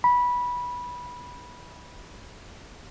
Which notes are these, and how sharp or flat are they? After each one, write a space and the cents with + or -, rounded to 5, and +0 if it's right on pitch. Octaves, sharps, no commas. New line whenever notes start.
B5 -15